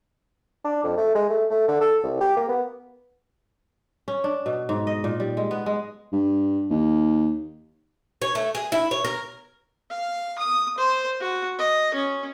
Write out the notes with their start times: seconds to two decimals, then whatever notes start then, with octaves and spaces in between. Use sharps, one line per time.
0.64 D4
0.83 F2
0.97 A3
1.15 G#3
1.29 A3
1.50 A3
1.68 D3
1.81 A4
2.03 C2
2.20 G4
2.37 A#3
2.49 B3
4.08 C#4
4.24 D4
4.46 B2
4.69 G#2
4.87 D#5
5.04 A#2
5.20 G3
5.37 G#3
5.51 B3
5.66 G#3
6.12 G2
6.71 D#2
8.22 C#5
8.35 A3
8.55 G#4
8.72 E4
8.91 C#5
9.04 A#4
9.91 F5
10.39 D#6
10.78 C5
11.21 F#4
11.59 D#5
11.94 C#4